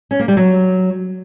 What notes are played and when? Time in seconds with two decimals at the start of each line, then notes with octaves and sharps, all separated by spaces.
0.11 C#4
0.20 A#3
0.28 G3
0.37 F#3